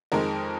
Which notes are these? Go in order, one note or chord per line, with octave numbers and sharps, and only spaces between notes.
F2 D#3 G#3 A#4